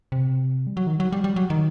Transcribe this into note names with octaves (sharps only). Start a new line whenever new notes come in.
C3
G3
F#3
D#3
F#3
G3
G3
F#3
D#3